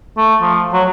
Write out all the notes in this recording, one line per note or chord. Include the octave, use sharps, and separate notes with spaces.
A3
F3
F#3